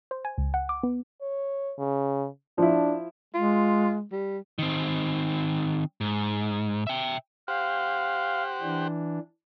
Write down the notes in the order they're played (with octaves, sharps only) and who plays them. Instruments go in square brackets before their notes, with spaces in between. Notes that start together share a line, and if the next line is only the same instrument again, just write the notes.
[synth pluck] C5
G#5
C#2
F#5
D6
B3
[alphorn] C#5
C#3
[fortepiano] F3 E4 [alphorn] D4
[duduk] G#3 [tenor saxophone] F4
[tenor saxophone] G3
[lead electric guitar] D#3 C4
G#2
E5 G5
[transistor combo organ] G4 C5 F#5 [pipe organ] F5
[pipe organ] E3 D4